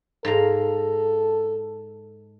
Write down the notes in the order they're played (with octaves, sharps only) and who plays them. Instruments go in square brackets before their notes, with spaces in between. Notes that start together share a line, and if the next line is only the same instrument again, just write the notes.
[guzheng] G#2 F5 A#5 [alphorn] A4